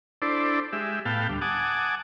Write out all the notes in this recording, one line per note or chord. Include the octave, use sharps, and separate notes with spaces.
D4 E4 A4 C5 D5
G#3 G4 E5
A2 B3 F5 G5 A5
D2 G3
F#5 G#5 A5 D6 D#6